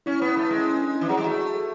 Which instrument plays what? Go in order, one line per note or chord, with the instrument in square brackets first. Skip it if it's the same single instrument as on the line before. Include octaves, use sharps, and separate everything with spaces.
[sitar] C#4 [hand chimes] E4
[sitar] B3
[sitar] A3 [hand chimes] E4
[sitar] G#3 [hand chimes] C#4
[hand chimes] C#4
D4
E4
[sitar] E3
[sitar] F#3 [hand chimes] G#4
[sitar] G#3
[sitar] A3 [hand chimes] F#4
[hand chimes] F#4
A4